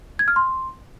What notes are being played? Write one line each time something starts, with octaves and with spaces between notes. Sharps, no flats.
G#6
F6
C6